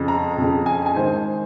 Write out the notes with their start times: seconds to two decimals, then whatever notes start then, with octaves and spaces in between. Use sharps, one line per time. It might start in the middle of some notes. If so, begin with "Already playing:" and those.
Already playing: F2 C#3
0.08 A#5
0.38 F2 C#3
0.66 G#5
0.86 G#5
0.96 G#2 D#3 C5